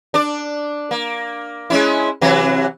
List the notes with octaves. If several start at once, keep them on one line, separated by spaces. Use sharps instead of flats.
D4 D5
A#3
G#3 C#4 E4
C3 E3 F#3